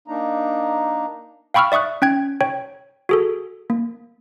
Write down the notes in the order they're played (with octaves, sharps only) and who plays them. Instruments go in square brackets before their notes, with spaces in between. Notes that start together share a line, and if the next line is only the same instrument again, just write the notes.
[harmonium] A#3 D4 D#4 A#5
[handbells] F5 G5 B5 C#6 E6 F6
D5 E5 C#6 D#6 F#6
C#4 G5 G#6
C#5 G5
F#4 G#4 A4
A#3